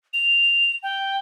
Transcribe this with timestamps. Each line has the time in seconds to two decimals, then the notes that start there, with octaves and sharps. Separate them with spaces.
0.13 F7
0.83 G5